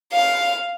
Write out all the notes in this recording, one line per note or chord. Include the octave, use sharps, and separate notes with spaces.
F5